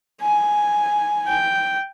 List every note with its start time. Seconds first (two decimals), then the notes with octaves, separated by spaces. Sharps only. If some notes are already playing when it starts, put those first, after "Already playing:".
0.22 G#5
1.28 G5